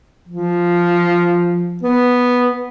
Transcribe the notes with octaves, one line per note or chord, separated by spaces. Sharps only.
F3
B3